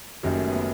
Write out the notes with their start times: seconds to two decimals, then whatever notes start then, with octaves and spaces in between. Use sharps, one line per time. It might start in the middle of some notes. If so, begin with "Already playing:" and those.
0.23 F#1 F#2 D#3 F#3 G3
0.36 A3
0.50 B3